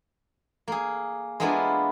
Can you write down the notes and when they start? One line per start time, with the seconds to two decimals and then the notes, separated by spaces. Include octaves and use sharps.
0.68 A#3 G#4
1.40 G#3 A#3 B3 D4 E4 F4